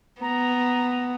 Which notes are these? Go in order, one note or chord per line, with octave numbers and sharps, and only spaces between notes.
B3 A#5